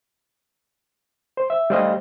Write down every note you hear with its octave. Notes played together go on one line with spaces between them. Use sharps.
C5
E5
G3 A3 C5 D#5 F5